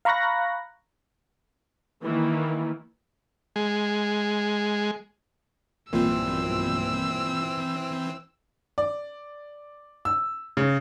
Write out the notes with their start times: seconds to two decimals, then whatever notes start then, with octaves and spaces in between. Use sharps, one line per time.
0.05 F5 A#5 B5 C#6 F#6 A#6
2.05 D#3 E3 A#3
3.56 G#3
5.93 B1 G2 A#2 E3 C4 E6
8.78 D5
10.05 E6
10.57 C#3